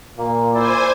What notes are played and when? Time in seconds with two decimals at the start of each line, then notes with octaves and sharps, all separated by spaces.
0.18 A#2 A#3
0.54 E4 C5 D5 G#5